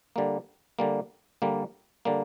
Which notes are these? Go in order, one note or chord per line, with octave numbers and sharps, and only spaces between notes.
D3 G3 A#3
D3 G3 A#3
D3 G3 A#3
D3 G3 A#3